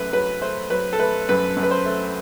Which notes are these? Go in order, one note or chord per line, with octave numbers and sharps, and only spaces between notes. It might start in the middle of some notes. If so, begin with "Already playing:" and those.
Already playing: F#2 A3 B4
F#3 B4
A3 C5
F#3 B4
A4
A3 B4
F#2 B4
F#2
B4
C5
A3